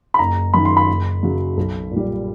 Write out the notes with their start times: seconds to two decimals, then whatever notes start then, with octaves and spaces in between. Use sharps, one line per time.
0.14 B5
0.19 F#1 A#5
0.54 F#2 D#3 B5
0.65 C6
0.77 B5
0.88 F#1
1.23 F#2 C#3 F#3
1.57 B1
1.91 A#2 G3